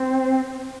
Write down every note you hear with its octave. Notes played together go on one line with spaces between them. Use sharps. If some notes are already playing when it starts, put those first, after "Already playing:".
Already playing: C4